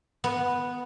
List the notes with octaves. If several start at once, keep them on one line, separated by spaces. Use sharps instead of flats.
B3